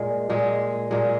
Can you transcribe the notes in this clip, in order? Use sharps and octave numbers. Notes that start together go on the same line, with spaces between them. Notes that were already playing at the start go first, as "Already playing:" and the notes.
Already playing: A#2 G#3
A#2 G#3
A#2 G#3